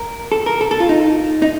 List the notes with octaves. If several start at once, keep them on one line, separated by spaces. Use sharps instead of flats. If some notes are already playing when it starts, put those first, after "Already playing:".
Already playing: A#4
A4
A#4
A4
A4
F4
D#4
D#4